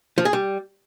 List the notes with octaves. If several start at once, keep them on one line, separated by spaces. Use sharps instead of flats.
F3
G#4
G3